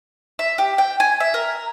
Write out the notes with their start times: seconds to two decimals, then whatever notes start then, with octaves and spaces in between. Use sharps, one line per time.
0.39 E5
0.58 G4
0.78 G5
1.00 G#5
1.20 E5
1.34 A#4